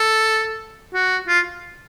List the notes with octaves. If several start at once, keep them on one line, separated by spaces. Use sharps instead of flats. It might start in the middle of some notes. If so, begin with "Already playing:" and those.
Already playing: A4
F#4
F4